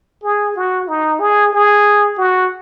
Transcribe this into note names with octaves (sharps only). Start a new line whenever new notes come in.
G#4
F#4
D#4
G#4
G#4
F#4